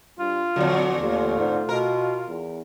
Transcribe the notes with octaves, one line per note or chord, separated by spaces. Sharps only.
G2 F4
E2 A#2 D3 F#3
D#2 A3 F4
G#2
B2 A#4
E2